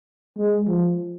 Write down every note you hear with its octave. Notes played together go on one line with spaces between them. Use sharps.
G#3
F3